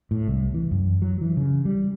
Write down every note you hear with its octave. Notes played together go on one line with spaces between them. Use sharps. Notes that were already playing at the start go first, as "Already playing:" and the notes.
A2
C2
E3
F#2
F#3
E3
C#3
G3